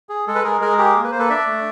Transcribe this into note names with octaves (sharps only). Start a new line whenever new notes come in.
G#4
G#3 A4
B4
G#3 G#4 A#4
G#3 G#4 A#4
G4 G#4 A#4
A#3
B4
A#3 C5
A4 B4
D4 D5 E5
A3